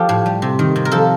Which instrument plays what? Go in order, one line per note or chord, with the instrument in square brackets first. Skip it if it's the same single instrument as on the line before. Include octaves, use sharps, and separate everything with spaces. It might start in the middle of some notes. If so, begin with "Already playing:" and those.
Already playing: [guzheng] F3 G4 A4
A2
G3
C3
D#3
C3
A#4
F3 A4